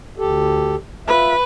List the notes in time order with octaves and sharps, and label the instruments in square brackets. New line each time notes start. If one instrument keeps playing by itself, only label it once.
[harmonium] D2 G4 A4
[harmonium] F4 E5 [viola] B4